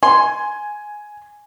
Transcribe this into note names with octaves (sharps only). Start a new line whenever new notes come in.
G#5 C6